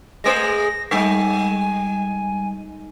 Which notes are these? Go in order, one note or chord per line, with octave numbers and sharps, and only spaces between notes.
G#3 A3 C5 A#6
G3 G#3 D#4 G#5